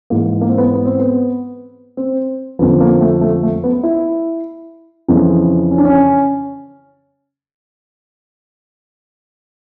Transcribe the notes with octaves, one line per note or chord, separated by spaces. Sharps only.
G#2 E3 A#3
A#3
C4
B3
B3
C4
B3
C4
F2 D3 F3 B3
A#3
A3
A3
A3
B3
E4
F2 C#3 E3
C#4
D4
C#4